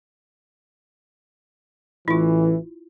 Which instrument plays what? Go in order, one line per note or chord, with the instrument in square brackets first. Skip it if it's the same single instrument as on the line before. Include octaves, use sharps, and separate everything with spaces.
[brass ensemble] A1 A2 E3 [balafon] E4 F4